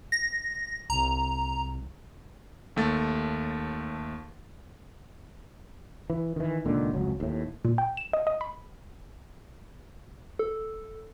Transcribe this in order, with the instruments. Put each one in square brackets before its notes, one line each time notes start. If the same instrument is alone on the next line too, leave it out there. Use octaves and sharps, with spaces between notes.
[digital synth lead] A#6
[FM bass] C2 [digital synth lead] A#5
[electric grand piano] D#2 A3 A6
[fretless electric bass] E3
D#3 E3
C#2 A#2 D3 D#3
F1 C#2 F#3
D#2 A2
[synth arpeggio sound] A#2
G5
E7
D#5
D#5
B5
[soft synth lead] A4